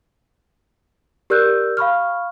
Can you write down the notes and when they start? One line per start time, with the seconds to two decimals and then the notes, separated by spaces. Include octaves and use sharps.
1.30 G4 A#4 D5 E6 F#6 G6
1.77 F5 B5 C#6 F6